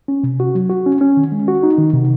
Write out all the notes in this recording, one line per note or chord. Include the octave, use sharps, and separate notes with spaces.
C#4
C3
F#4
F#3
F#4
C#4
C#4
D#3
G#3
F#4
D#4
D#3
C3